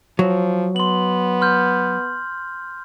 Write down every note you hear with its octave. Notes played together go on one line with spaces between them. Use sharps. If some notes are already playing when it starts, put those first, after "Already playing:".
F3 F#3
B3 C6 F#7
C6 F6 G6